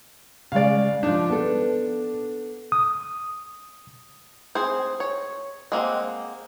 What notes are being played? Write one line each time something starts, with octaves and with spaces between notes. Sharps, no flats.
C#3 G#3 D5 F5
F3 D4 D#4
B3 A4
D#6
C4 G#4 C5
C#5
G#3 A#3 C4 F#5